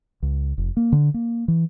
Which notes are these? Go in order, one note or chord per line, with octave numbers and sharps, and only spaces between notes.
C#2
F1
A#3
D3
A#3
E3